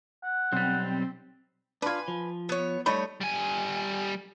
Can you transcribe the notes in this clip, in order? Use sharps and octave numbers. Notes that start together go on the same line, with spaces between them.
F#5
B1 G3 C4
D4 F4 B4 G#5
F3
B3 C#5
G3 A3 D#4 C#5 D#5 B5
G3 G#5